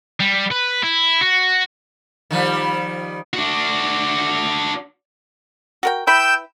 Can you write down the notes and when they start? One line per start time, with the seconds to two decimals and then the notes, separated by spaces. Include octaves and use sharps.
0.20 G3
0.52 B4
0.84 E4
1.21 F#4
2.31 D#3 F3 G3
3.33 D4 F#4
5.83 F#4 A#4 G5
6.07 E4 B4 G5 B5 E6 G6